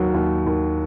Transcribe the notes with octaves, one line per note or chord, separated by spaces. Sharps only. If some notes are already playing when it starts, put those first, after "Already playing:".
Already playing: D#2 F#3
D#2
D#2